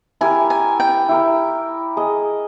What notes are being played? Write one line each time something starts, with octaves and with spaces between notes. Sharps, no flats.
E4 G4 A#4 G#5
G#5
G5
E4 G4 A#4
G#4 D#5